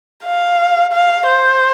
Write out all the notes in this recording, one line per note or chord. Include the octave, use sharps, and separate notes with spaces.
F5
F5
C5